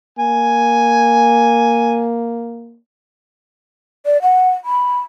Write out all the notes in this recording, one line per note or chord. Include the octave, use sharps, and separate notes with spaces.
A#3 G#5
D5
F#5
B5